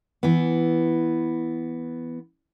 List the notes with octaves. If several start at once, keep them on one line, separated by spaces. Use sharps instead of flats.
E3 B3